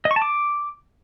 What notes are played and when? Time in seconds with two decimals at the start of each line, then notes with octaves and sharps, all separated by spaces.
0.05 D#5
0.11 C#6
0.16 A5
0.22 D6